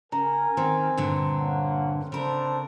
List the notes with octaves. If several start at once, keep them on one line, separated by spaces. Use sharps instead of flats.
C#3 A#4 G#5 A#5
D#3 C4 G5
G2 A#2 D3
A#3 C#4 F#5
C#3 D4 A4 A#4 C5